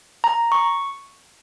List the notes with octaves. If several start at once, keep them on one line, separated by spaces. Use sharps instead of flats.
A#5
C#6